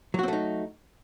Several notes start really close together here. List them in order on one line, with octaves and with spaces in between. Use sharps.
F#3 F#4 C4 A3 D#4